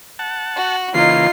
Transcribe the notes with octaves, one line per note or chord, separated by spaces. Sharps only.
F#5 A5
F#4
C#3 E3 A#3 D#4 F4 C7